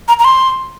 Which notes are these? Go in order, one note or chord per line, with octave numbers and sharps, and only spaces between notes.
A#5
A#5
C6